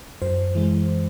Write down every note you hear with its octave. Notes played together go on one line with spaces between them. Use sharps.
F#2 C5
E3 G#3